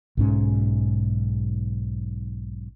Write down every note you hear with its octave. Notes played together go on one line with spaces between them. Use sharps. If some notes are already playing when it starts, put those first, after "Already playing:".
B1 G#2 C#4